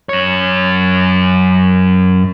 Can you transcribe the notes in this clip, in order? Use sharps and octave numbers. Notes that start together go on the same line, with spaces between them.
F#2 C#5